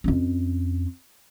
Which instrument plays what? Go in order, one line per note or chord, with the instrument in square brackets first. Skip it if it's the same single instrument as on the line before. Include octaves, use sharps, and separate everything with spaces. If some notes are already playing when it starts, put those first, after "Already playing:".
[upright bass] F2 C#4